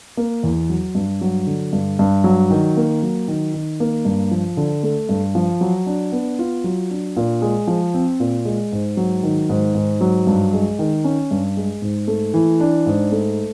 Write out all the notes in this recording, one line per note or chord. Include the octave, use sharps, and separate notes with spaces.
A#3
E2
F#3
G2
F#3
D3
G2
G2
F#3
D#3
A#3
F#3
D#3
D#3
A#3
G2
F3
D3
A3
G2
F3
F#3
D4
B3
F4
F#3
D4
A#2
G#3
F3
C4
A#2
G#3
G#2
F#3
D#3
G#2
G#2
F#3
G2
G#3
D#3
C#4
G2
G#3
G#2
A3
E3
D4
G#2
A3